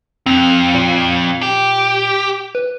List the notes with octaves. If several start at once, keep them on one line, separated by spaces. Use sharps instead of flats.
F2 C4
A#2
G4
B4